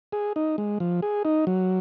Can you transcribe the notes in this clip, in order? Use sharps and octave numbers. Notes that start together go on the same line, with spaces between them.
G#4
D#4
G#3
F3
G#4
D#4
F#3